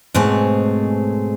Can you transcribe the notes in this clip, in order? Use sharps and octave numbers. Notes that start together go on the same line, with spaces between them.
G#2 B2 A3 C4 G#4 C#5